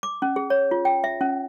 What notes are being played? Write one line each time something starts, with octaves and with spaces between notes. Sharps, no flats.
D6
C#4
G#4
C#5
F4
G5
E5
C#4